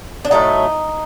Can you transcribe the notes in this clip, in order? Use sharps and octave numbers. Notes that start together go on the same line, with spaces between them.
D4
A2 F#3 A3 D#4